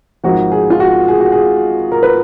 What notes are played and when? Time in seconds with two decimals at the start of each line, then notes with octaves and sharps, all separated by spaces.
0.24 G#1 G#2 F3 F#4
0.52 G#4
0.70 F4
0.80 F#4
1.08 G#4
1.20 F#4
1.32 G#4
1.92 A#4
2.03 B4